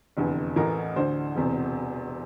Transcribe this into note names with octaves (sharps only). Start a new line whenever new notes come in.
F1 E2 D3
A1 A2 E3 A#4
D2 D3 C5
E1 E2 C3